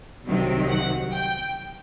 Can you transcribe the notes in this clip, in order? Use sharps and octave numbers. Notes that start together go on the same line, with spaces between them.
C2 C3 D#3 F#3
F#5
G5